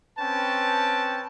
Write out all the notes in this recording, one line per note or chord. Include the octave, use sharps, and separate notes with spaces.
C4 C#4 B4 G5 A5